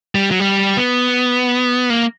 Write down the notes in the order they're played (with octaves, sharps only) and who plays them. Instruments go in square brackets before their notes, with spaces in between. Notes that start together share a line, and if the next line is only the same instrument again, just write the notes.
[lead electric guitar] G3
F#3
G3
B3
A#3